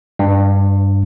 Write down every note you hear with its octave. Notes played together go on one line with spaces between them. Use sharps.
G2